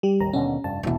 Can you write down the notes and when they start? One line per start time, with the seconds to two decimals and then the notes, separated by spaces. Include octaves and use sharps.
0.03 G3 G4
0.20 A1 D#2 A#5
0.33 D#2 B2 D3 C#4
0.64 F1 G2 A5
0.83 E1 B1 B2 E3